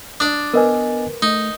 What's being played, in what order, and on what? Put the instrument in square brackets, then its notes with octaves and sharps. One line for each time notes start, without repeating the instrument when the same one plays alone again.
[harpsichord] D4 D5 [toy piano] D#6
[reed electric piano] B3 D#5 G#5 [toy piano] A#4 B4
[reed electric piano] A3 [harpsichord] D#4